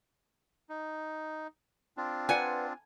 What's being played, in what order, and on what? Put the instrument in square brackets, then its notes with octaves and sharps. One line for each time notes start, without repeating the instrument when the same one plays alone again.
[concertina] D#4
C4 D4 F4
[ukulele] B4 D5 F#5 [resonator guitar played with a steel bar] G#5